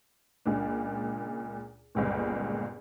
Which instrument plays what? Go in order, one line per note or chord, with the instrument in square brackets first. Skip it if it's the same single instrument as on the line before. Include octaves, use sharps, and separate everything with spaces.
[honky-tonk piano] C#2 A#2 D4
G1 C#2 A#2